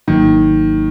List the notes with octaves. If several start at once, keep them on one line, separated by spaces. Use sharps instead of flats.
G#1 G#2 D#3 F#3 A#3